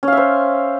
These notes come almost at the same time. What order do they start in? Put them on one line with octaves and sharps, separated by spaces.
C#4 F5 E5 C5